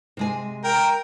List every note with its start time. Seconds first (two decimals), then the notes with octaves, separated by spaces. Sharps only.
0.17 C3 G#3 G#5
0.64 A#4 G5